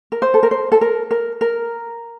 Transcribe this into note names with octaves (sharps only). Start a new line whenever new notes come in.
A#4
C5
A4
A#4
C5
A4
A#4
A#4
A#4